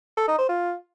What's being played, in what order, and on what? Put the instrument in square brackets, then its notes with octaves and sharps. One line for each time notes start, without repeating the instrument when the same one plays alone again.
[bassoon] A4
D#4
C5
F4